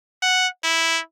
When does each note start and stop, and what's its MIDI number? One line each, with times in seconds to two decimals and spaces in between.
0.22 0.47 78
0.63 1.00 64